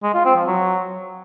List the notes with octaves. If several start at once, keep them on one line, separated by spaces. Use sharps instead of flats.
G#3
F4
C4
F3
F#3